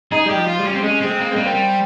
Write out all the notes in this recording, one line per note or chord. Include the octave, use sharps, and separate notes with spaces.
D#4 G#4
G3 G4
F3
F4
G3
C#4
C4
G#3 C#4
C4
G#3
A#3
C4
G3 A#3
C4
G3